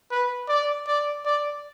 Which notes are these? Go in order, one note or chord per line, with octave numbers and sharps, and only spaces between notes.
B4
D5
D5
D5